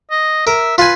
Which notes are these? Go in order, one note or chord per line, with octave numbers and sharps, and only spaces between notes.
D#5
A#4 E5
F4 B4 G#5